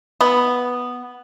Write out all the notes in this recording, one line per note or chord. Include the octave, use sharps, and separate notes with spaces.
B3